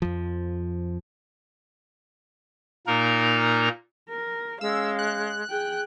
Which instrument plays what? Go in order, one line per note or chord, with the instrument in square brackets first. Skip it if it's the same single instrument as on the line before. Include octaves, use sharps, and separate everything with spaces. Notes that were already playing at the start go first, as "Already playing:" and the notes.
[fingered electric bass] F2 F3
[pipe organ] A#2 A#3 D#4 A#4 A#5
[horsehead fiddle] A#4
[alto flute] G#3 [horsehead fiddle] C#4 F5 [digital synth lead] E6
[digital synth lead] F#6
[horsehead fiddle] G#4 G5